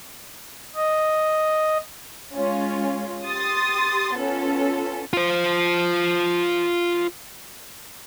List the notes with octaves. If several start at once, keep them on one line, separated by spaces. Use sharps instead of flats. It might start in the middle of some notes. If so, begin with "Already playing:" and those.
D#5
G#3 C#4 F4
G4 C6 D#6 A6
B3 C#4 F4 A4
F4 C5